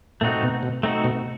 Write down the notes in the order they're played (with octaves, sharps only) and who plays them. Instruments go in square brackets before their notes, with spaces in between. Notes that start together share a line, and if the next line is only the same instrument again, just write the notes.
[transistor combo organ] A#2 [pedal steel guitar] A3 C4 D#4 F#4
[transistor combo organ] B2
B2
[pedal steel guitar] A3 C4 D#4 F#4
[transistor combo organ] B2